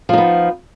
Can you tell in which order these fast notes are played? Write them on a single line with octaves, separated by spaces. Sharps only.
F3 D#4 B3